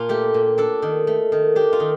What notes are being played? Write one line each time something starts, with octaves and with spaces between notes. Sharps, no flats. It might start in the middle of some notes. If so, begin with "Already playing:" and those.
Already playing: A#2 D4 F4
A3 G4
A#2
D4 A4
D#3
A3
D#3
D4 G4
F4
D#3